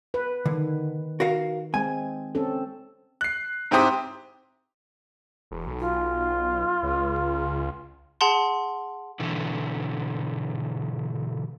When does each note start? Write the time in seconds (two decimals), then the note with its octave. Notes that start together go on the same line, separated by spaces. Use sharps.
0.14 B4
0.46 D3 D#3
1.20 F#4 A#4 F5
1.74 G#3 C4 G#5
2.35 C4 C#4 A4
3.21 F#6 C7
3.71 G#2 C4 E4 G4 C5 D#6
5.51 E1
5.67 B1
5.80 F4
6.83 C#2
8.21 G#4 F#5 A5 C6
9.20 B2 D3 E3